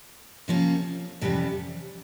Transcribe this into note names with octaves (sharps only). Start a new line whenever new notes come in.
C3 F3 A#3 C#4
F2 C3 E3 G3 C#4